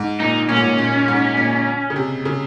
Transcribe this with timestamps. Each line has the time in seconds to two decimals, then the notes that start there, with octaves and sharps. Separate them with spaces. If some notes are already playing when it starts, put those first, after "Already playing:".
Already playing: G#2
0.20 A#2 D#4
0.49 A#2 C#4
0.57 G#2
0.64 A#2
0.78 A#2
1.08 G#2
1.37 A#2
1.90 C#3
1.96 C3
2.25 C#3